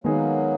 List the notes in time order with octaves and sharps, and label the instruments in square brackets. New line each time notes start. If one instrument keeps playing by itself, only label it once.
[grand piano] D#3 G#3 B3 D#4 G#4 [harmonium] F#3 A#3